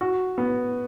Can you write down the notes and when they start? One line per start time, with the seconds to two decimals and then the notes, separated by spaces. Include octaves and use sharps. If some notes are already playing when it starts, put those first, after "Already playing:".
0.01 F#4
0.38 B3